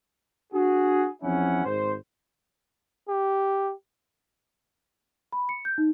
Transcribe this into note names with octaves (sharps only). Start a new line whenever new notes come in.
D4 F#4 G#4
E2 F3 C4 C#4 E4 F#5
G#1 C5
G4
B5
C#7
G6
D#4